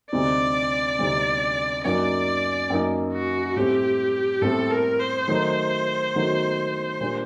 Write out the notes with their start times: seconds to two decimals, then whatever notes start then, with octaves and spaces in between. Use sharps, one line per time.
0.12 D2 C3 G3 C4 D#4 D5
0.98 D2 C3 G3 C4 D#4
1.84 F#2 F#3 A#3 D#4 D5
2.70 F#2 F#3 A#3 D#4
3.13 F#4
3.56 A2 G3 C4 G4
4.42 A2 G3 C4 A4
4.70 A#4
4.99 C5
5.28 D#3 F#3 A3 D#4 F#4
6.14 D#3 F#3 A3 D#4 F#4
7.01 A#2 G3 D4